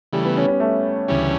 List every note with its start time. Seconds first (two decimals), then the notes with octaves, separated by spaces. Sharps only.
0.13 C#3 E3 G3 A3
0.24 B3
0.37 C#4
0.48 C#4
0.60 A3
1.08 D2 C#3 E3 G3 C#4